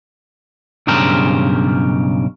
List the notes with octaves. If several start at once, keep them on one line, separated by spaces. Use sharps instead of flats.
B1 G2 C#3 G4 A#4 C5